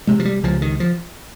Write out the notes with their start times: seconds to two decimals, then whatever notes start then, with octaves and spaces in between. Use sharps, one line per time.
0.07 C3 G#3
0.20 F3
0.25 G3
0.43 C#2 F3
0.62 D#3
0.80 F3